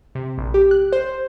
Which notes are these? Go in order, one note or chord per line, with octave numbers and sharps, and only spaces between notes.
C3
A#1
G4
F#6
C5